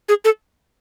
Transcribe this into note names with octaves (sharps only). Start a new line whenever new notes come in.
G#4
A4